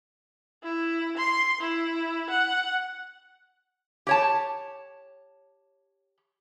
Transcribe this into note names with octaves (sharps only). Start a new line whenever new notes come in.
E4
C6
E4
F#5
G4 C#5 A5